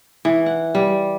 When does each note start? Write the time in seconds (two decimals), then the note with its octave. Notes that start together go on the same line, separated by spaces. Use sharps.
0.25 E3
0.46 F#5
0.75 G3